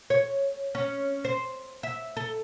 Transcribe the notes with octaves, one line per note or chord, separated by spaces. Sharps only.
C#5
C#4
C5
E5
A4